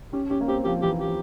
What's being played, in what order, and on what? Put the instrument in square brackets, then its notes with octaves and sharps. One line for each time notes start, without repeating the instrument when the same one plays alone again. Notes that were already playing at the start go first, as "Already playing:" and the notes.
[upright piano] C#4 [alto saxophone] G4
[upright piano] C#4 [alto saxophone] G4
[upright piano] A#3
[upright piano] C4 [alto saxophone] G4
[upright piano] F3 [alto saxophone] G4
[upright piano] E3 [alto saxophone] G4
[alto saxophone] G4
[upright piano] F3